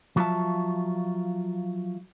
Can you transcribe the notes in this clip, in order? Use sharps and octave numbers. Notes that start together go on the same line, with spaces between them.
F3 F#3 F4 A#4 E5 A5